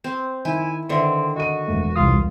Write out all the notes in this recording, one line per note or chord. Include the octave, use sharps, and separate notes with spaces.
C4
D#3 E4 G#5
D3 D#3 C4 B4 E5
F#4 D#5 D#7
E1 A3
C2 F4 D#6